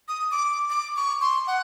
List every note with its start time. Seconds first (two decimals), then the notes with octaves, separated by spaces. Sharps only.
0.08 D#6
0.31 D6
0.70 D6
0.96 C#6
1.21 C6
1.47 F#5